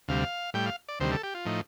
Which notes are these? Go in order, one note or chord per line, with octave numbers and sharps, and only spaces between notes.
D2 C3 G3 F5
A2 G3 G5
F5
D5
D2 C3 D#3 G3 C5
A4
G4
F4
A2 F3 D#4